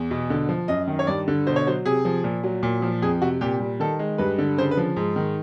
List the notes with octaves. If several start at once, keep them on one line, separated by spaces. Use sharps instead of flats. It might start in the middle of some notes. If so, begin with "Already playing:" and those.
Already playing: E2
B2
D3
F3
F#2 D#5
D#3
C#5
G2 D5
D3
B2 C5
C#5
F#3 C5
C3 G#4
F3
A#2
F#3
A#2
F3
F2 G#4
C3 F#4
A#2 G4
G3
D#3 A4
G#3
G2 B4
D3
C#3 C5
B4
F3
G#2
D#3